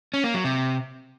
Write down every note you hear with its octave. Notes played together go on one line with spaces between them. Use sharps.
C#4
A#3
F#3
C3